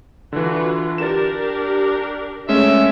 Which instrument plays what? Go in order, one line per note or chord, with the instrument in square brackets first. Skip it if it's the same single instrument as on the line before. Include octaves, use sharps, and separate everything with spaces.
[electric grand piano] D3 E3 [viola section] F4 F#4 B4
[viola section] D4 G4 A#4 [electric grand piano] A6 E7
[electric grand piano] G#3 A3 C#4 [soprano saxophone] E5